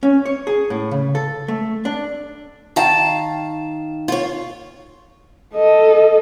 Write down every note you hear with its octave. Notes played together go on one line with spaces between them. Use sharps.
C#4
C#5
G#4
A2
C#3
A4
A3
D4
D#3 F5 A5 A#5
F4 C#5
A4 D#5